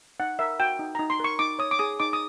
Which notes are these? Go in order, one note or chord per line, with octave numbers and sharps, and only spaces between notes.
D#4 F#5
A#4 E5
F#4 G5
D#4
D#4 A#5
C6
A#4 C#6
D#4 D6
C#5 D#6
D6
G#4 D#6
D#4 D6
D#6